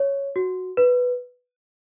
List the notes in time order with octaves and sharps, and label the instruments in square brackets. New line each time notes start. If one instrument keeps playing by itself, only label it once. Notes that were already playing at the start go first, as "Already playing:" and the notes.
Already playing: [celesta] C#5
F#4
B4